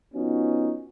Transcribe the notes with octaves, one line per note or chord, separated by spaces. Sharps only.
F3 B3 C#4 D#4 F#4